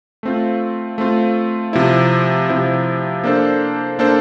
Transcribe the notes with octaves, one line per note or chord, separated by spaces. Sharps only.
A3 C4 F4
A3 C4 F4
C3 F3 C4 E4
C3 F3 C4 E4
A#3 D4 A4 C5
A#3 D4 A4 C5